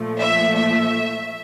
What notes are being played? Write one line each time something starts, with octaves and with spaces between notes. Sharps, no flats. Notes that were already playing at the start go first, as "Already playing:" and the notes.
Already playing: A#2 F3 A3
E5
E5